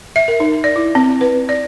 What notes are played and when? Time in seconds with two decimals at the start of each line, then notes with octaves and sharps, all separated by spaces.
0.16 E5
0.28 A#4
0.40 D#4
0.64 D5
0.76 E4
0.95 C4
1.21 B4
1.49 D5